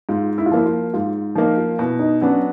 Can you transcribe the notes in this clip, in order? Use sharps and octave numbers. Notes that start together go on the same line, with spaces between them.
G#2 F4
E4
F4
F3 A#3 E4
F4
G#2 F4
F3 A#3 D#4
F4
B2 E4
D#4
F#3 B3 C#4 D4